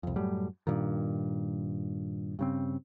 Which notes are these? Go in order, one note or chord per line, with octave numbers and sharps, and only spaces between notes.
C2 F2
F#2 A2 G3
G2 A#2 D#3
G2 C#3 C4